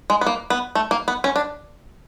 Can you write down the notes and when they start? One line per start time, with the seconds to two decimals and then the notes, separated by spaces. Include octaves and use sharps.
0.10 G#3
0.21 B3
0.26 A#3
0.50 B3
0.75 A3
0.91 A#3
1.08 B3
1.24 C#4
1.36 D4